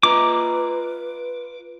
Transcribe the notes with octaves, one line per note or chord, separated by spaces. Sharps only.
F4 B4 D#5 A#5 D6